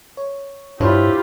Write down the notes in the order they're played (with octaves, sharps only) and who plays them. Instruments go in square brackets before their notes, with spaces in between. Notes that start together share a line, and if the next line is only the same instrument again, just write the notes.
[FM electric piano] C#5
[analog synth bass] G2 [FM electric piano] D4 C5 C#5 [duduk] E4 [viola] F4 G4